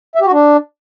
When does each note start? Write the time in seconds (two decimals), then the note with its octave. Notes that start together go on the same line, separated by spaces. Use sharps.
0.15 E5
0.21 G4
0.26 F#4
0.32 D4